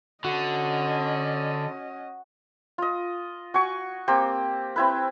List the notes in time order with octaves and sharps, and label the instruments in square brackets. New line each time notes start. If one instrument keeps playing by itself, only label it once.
[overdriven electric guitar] D3 [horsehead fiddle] C#4 D#5 [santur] F#4
[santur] F4 D#5
F#4 G#5 C#6
A#3 C4 G4
C4 E4 B4